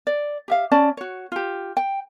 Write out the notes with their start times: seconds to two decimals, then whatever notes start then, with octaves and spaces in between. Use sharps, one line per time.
0.07 D5
0.48 G4 E5 F5
0.71 C#4 D5 A5
0.97 F#4 C#5
1.32 F4 G4
1.77 G5